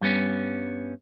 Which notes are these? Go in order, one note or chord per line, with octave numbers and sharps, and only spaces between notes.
G2 G3 B3 C#4